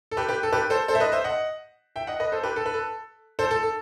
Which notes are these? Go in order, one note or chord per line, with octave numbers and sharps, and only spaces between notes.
A4
G4 B4
G4 B4
A4
G4 B4
A4 C5
A4 C5
E5
B4 D#5
C5 E5
D#5 F#5
E5 G5
D#5 F#5
B4 D#5
A4 C5
G4 B4
A4
B4
A4
A4 C5
A4
A4